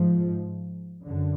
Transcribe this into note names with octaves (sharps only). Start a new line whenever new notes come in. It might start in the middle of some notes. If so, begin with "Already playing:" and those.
Already playing: G#2 F3
F#2 D3